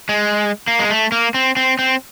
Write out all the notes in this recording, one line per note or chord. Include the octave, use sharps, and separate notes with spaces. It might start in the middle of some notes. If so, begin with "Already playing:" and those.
G#3
A#3
G#3
A3
A#3
C4
C4
C4